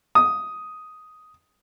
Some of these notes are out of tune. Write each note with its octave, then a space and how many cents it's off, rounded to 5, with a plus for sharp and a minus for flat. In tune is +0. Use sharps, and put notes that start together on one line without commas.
D#6 +5